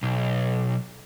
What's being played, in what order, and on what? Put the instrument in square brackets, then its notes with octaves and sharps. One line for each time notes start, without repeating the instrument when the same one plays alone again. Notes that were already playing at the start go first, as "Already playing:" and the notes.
[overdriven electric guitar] B1